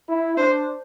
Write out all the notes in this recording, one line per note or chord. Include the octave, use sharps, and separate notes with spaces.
E4
D4 C5